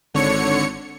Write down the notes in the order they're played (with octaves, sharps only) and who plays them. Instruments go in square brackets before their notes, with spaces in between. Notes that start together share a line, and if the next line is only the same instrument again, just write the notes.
[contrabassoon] G#1 [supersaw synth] D3 C#5 C#7